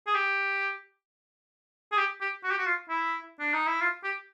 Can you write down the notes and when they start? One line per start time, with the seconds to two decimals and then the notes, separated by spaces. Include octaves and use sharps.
0.07 G#4
0.14 G4
1.92 G#4
1.98 G4
2.21 G4
2.44 F#4
2.51 G4
2.58 F#4
2.66 F4
2.89 E4
3.40 D4
3.53 D#4
3.67 E4
3.81 F4
4.04 G4